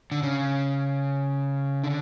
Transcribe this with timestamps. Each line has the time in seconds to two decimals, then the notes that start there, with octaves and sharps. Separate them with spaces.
0.12 D3
0.23 C#3
1.84 D3